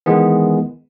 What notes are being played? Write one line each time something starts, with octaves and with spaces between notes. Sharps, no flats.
D#3 E3 G#3 B3